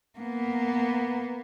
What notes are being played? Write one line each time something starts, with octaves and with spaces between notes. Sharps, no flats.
A#3 B3